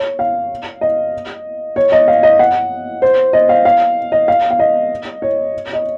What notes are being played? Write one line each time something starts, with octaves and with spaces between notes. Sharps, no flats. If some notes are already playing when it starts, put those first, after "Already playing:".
Already playing: C#5
F5
D#5
C#5
D#5
F5
D#5
F#5
C5
D#5
F5
F5
D#5
F5
F5
D#5
C#5
D#5